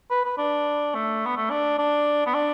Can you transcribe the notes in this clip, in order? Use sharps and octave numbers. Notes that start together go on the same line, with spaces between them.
B4
B4
D4
A3
B3
A3
D4
D4
B3
D4